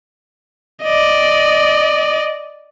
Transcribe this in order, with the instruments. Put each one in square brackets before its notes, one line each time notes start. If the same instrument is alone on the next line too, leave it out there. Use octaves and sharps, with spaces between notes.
[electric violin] D5 D#5